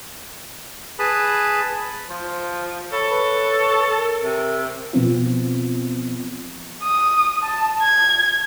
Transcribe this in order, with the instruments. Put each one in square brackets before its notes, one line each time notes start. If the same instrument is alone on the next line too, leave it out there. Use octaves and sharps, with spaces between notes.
[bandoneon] G#4 B4 A5 B5 D#6
[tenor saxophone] F3 [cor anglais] C5
[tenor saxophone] A4 [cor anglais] C#5 [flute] B5
[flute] B4
A#4
[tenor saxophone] C3
[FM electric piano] B2 F3 B3 C4 F4
[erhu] D#6
A5
G#6